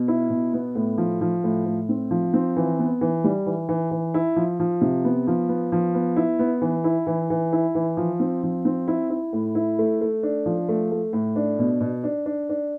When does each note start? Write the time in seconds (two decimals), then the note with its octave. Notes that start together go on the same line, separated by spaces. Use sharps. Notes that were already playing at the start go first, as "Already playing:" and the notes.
Already playing: B2
0.08 E4
0.30 B2
0.54 B3
0.75 A2
0.98 F3
1.21 F3
1.44 A2
1.66 A2
1.89 C4
2.11 F3
2.34 C4
2.57 E3
2.79 B3
3.01 E3
3.24 G3
3.46 E3
3.69 E3
3.91 E3
4.14 E4
4.36 F3
4.60 F3
4.81 C3
5.05 B3
5.27 F3
5.49 B3
5.72 F3
5.94 B3
6.16 E4
6.39 B3
6.62 E3
6.84 E4
7.07 E3
7.30 E3
7.53 E4
7.75 E3
7.97 F3
8.20 C4
8.43 F3
8.65 C4
8.88 E4
9.10 E4
9.33 A2
9.55 E4
9.79 A3
10.01 A3
10.23 D4
10.46 F3
10.69 A3
10.91 A3
11.13 A2
11.36 D4
11.59 B2
11.81 B2
12.04 D4
12.26 D4
12.49 D4